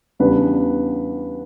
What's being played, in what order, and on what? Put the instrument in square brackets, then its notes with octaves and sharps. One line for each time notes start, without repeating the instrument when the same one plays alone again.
[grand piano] E2 C#3 G3 B3 D4 B4